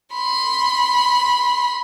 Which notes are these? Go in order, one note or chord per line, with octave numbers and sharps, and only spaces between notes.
B5 C6